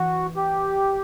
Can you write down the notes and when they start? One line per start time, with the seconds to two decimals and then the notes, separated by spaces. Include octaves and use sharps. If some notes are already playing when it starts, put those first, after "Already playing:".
Already playing: E3 F#4
0.36 G4